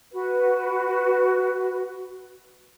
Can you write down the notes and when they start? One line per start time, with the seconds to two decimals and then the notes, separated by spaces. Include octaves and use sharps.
0.12 F#4 B4